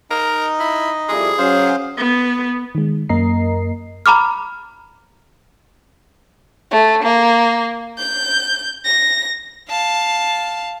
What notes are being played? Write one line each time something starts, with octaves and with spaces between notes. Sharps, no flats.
D#4 A#4 D#5
E4
F2 G3 E4 G#4
F#3 C#4 C5 F5 C6
B3
D#3 G#3
F#2 A#3 A#4 D#5 A#5 C7
A#5 B5 D6 F6
A3
A#3
G6
A#6
F5 A5